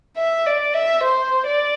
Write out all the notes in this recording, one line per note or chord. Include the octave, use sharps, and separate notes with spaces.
E5
D5
E5
C5
D5